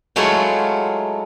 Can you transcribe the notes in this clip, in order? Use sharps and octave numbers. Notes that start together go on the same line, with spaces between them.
F#3 G#3 A3 E4 F4 C#5